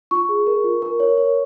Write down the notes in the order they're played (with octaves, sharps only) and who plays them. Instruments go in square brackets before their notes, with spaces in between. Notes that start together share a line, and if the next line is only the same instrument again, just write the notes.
[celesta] F4 C#6
G#4
A#4
F4
A#4
C#5
C#5